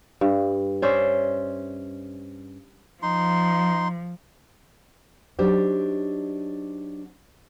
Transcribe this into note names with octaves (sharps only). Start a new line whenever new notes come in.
G2
C#4 C5 D5 E5
F3 D#4 C6
F#3 D4 D#4 G4 C5 D5